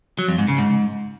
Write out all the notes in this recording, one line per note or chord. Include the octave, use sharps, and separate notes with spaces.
F#3
F2
G#2
C#3
G#2